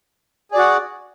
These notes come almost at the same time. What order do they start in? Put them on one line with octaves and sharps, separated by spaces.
G#4 D5 F#4 F#5